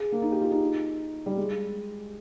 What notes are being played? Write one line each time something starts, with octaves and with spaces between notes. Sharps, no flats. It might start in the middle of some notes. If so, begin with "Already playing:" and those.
Already playing: G#4
A#3
D#4
G4
F4
D#4
G3
G#3